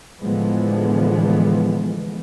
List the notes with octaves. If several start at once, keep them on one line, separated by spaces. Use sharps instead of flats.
A2 D3 E3 F3 G#3 B3